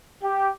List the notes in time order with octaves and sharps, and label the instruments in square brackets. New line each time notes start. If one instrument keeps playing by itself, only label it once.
[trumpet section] G4